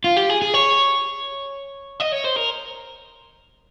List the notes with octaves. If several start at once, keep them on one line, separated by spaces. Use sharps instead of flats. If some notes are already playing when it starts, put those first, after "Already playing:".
F4
G4
G#4
G#4
C#5
D#5
C#5
C5
A#4